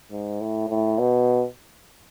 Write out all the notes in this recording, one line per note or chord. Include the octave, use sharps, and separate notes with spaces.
G#2
A2
A2
B2